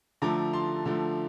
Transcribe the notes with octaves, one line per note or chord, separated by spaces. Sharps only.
D3 F3 A3 A#5 D6
A5 C6
D3 F3 A3